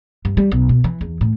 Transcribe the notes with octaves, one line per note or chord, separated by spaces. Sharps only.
G2
G3
B1
B2
E3
E2
A2